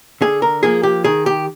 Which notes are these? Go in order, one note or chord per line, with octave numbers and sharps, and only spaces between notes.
D3 G#4
A#4
F3 A#3 G#4
G4
D#3 G#4
G4